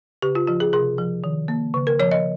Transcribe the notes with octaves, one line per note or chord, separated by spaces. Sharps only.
C#3 G4
F4
F3 F4
G#4
C3 G#4
F3
D#3
A#3
C#3
A#4
F3 C#5
D#5